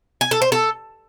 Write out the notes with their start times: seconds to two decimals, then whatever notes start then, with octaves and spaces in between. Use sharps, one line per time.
0.21 G#5
0.31 A4
0.42 C5
0.52 A4